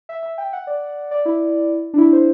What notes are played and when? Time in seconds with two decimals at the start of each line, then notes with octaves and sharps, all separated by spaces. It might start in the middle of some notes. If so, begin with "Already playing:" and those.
0.09 E5
0.23 E5
0.38 G5
0.53 F#5
0.67 D5
1.11 D5
1.25 E4
1.94 D4
1.98 E4
2.13 C5